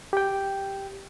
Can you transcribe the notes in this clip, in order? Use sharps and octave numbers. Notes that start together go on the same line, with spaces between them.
G4 G5